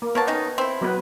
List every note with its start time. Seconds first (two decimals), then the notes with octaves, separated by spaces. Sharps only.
0.02 A#3
0.15 A#3 B3 A#4 C#5 A5
0.27 D#3 C#4 D#4
0.58 C4 E4
0.81 F#3 B3 B4